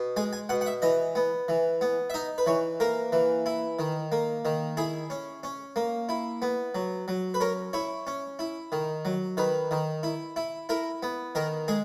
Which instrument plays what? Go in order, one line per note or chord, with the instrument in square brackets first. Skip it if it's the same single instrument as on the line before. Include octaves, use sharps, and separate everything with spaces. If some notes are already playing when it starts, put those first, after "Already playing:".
Already playing: [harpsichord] B2
G#3 G#5
G#5
B2 F#5
F#5
E5
E3 D#5
B3
E3
B3
E5
D#4 D#5
B4
E3 C#5
A#3 A#4
E3
E4
D#3
A#3
D#3
E4 G#4
C#4
C#4
A#3
E4
B3
F#3
F#3
B4
C#4 A#4
E4 C#5
C#4
E4
D#3
F#3
D#3 B4
D#3
E4
E4
E4 A#4
B3
D#3 A#4
G#3 G#4